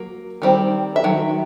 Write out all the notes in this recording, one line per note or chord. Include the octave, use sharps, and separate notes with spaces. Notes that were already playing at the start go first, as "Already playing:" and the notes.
Already playing: F#3 A#3
D#3 G3 C4
E5
D#3 F#3